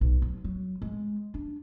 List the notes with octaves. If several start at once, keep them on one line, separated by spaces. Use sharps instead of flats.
B1
F#3
F#3
G#3
D4